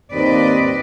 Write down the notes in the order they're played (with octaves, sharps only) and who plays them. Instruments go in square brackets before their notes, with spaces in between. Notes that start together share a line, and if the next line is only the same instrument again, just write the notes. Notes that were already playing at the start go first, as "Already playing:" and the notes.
[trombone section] D#2 [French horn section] C4 [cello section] B4 D5 D#5